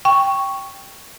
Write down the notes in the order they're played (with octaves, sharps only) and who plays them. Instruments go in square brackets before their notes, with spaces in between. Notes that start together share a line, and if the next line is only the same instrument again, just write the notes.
[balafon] G5 [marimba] C#6